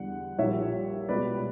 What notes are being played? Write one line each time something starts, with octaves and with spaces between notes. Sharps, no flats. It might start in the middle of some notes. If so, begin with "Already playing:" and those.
Already playing: E2 D3 G3 F#5
A#1 A#2 G3 C#5 E5
C#2 B2 G3 B4 D5